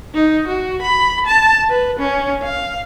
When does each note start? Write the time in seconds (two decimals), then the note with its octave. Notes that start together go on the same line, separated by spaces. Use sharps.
0.14 D#4
0.47 F#4
0.82 B5
1.26 A5
1.69 B4
1.99 C#4
2.43 F5